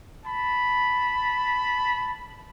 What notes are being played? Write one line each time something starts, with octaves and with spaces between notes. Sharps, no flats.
A5 B5